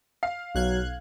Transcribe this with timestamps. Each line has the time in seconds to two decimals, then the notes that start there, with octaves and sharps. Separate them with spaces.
0.23 F5 C7
0.55 B1 F#3 F#6 G#6